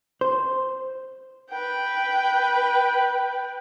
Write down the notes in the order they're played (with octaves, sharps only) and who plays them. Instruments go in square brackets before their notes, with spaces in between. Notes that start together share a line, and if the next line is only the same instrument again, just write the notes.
[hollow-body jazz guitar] C5
[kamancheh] B4 G5